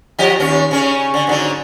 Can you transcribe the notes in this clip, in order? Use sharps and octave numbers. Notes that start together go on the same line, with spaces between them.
F3 G4 D#5
D#2 C#4
C#3 C#4
D3
G#2 D3 F#3